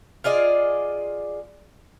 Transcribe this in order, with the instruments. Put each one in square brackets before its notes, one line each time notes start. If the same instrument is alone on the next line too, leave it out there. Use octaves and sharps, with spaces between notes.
[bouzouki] F4 G#4 D5 D#5